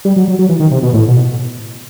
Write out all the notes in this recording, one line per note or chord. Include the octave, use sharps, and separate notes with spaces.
G3
F#3
F#3
F#3
E3
D#3
C3
B2
A2
B2